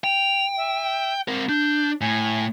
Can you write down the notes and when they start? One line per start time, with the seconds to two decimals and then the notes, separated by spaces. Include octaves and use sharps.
0.04 G5 F7
0.57 E5
1.28 C4 A#4
1.49 D4 G6
2.01 A2 G#5